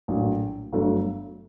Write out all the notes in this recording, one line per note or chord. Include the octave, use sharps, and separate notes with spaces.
A#1 A2 F#3
G1 G2 F#3 A3